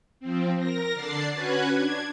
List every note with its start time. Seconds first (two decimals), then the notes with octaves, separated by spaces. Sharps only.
0.20 F3 C4
0.59 A#4 A#6
0.94 D3 D4 D5 A6 C7
1.34 C#4 F#4 B4 F#6 G#6
1.77 D4 G#6